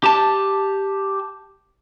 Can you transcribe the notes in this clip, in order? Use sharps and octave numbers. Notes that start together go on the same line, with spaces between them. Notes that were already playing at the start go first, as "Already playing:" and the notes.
G4 A5